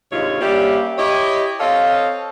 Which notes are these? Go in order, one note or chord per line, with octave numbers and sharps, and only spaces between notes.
D2 G#2 C3 D#3 F4 C#5
G3 A#3 C#4 D4 G4 E5
E4 G4 C#5 D#5
C4 A4 C#5 D#5 F5